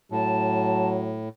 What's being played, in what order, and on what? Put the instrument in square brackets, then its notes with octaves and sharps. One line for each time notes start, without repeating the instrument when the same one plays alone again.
[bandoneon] A2 [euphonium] F#3 [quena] A5